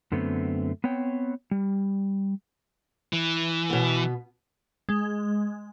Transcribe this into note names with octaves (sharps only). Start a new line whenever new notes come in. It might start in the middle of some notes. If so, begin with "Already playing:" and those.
F#2 D3 A3 B3 C4
B3 C4 C#5 G5
G3
E3
B2 B3
G#3